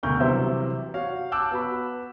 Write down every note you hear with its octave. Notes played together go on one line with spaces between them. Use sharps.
E1 D2 A#4 C#6 G6
C3 E3 F#3 G3 C5 E5
F#4 C#5 F5
A5 D6 E6 F#6 G6
B3 F#4 B5